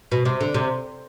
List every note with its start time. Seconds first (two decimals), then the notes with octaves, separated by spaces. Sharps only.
0.12 B2
0.25 C3
0.41 D3
0.54 C3